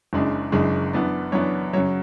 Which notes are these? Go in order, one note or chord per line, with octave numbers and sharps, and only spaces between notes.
F#1 F#2 C#3 G#3 D4
F#1 F#2 C#3 G#3 D4
F#2 E3 B3 D4
F#2 E3 B3 D4 C#5
F#2 C#3 F#3 C#5